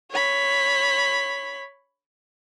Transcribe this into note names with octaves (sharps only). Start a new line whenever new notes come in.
C#5 B5